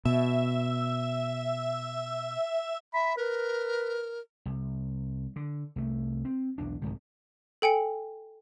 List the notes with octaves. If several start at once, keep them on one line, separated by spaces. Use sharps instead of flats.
B2 E5
E5 B5
A#4 B4
C2
D3
C2 A3
C4
B1 E2 D4
B1 E2 G#2 C3
A4 G5 G#5 C#7